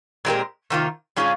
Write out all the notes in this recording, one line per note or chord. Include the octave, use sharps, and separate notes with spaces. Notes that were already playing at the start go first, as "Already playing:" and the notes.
A#2 G#3 C4 G4 A#4
C3 D#3 A#3 F4
A#2 G#3 C#4 F4 G#4